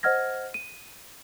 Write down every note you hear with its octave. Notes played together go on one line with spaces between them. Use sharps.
C5 D#5 F#5 F6 G#6 A#6
D#7